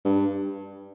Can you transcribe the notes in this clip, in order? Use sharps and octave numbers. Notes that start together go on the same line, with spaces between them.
G2